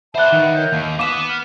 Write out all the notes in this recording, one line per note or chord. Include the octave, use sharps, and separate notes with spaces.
C5 D5 E5 F#5 A5 B5 F#6
D#3 B4 F#5
A#4 C#5 G6
D#2 F5
B3 B4 D6 D#6 E7
F6